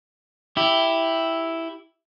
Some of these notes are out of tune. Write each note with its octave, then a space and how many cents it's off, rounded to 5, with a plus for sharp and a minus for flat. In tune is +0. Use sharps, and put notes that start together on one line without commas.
E4 +0 G4 +0